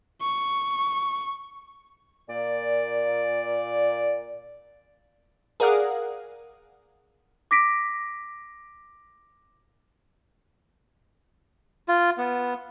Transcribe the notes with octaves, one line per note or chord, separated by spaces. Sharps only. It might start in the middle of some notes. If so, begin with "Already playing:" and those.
C#6
A#2 D5
G#4 A#4 D5 F5 F#5 D#6
D6 A#6 B6 D7
F4
B3